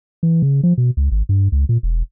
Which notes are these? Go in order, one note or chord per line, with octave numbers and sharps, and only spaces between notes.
E3
C#3
F3
B2
C#2
G#1
G2
C#2
A#2
E1